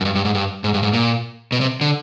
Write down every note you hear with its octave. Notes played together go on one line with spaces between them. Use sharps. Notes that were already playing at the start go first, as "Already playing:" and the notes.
F#2
G2
G2
G#2
G2
G#2
G2
G#2
A#2
B2
C3
D3